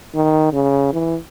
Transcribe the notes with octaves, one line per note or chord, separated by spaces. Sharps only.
D#3
C#3
E3